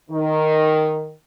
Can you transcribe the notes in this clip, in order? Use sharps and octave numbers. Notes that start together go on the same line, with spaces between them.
D#3